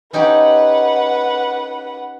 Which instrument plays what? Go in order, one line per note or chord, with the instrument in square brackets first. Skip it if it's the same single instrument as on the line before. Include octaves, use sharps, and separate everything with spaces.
[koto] C#4 D#4 G4 [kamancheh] B4 F#5